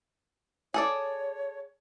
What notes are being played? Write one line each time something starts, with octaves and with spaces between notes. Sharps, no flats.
G#4 A4 C#5 D5